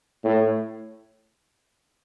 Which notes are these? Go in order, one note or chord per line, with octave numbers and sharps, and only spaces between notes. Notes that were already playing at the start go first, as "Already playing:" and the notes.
A2